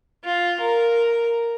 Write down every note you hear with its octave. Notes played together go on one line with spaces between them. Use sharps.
F4
A#4